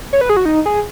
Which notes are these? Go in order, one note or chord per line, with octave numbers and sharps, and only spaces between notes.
C#5
B4
G#4
F#4
D#4
G#4